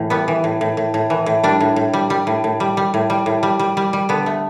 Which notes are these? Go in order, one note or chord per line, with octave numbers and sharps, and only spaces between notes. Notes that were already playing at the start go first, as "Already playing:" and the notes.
Already playing: A2 E3
G3 B3
E3
A2
A2
A2
A2
E3
A2
G3 D4
A2
A2
G3
G3
A2
A2
G3
G3
A2
G3
A2
G3
G3
G3
G3
D3 B3
A3